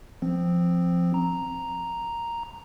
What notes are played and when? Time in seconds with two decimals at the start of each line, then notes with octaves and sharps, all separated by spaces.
0.22 F3 C4
1.14 A#5